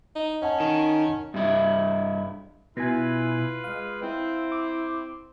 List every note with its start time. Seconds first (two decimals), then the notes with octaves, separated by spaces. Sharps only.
0.15 D#4
0.42 C#4 D#5 F#5 A5
0.60 D#3
1.34 G2 E4
2.77 B2 E4 F4 B4 G#5
3.64 G#3 F5
4.02 C4 E4
4.52 D6